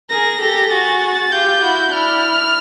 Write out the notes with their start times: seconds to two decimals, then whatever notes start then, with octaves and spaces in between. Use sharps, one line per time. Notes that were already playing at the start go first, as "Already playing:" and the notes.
0.10 G#4 A#4 A#6
0.40 G4 A4
0.71 F#4 G#4 A6
1.32 F4 G4 G6
1.62 E4 F#4
1.92 D4 E4 F6